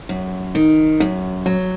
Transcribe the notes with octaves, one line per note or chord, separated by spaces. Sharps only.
F#2
D#3
F#2
F#3